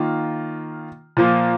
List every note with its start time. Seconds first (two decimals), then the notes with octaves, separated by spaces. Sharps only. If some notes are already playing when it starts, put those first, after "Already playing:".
Already playing: D#3 A#3 F4
1.17 A#2 F3 A#3